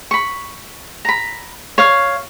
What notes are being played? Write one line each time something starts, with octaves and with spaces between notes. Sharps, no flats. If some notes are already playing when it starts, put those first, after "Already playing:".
B5 C#6
A#5 B5
C#5 F5